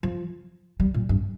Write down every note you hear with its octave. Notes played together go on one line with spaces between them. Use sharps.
F3
G3
A#2
G2